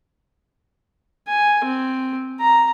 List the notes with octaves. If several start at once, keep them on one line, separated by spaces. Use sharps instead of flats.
G#5
C4
A#5